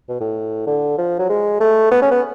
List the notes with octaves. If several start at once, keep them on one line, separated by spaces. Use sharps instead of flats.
B2
A2
D3
F3
F#3
G#3
A3
B3
C#4
B3